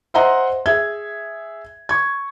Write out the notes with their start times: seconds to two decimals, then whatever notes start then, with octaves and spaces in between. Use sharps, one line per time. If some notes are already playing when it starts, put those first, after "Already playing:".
0.14 C5 D#5 E5 F#5 A#5 C6
0.66 G#4 E5 G#6
1.89 C#6 G#6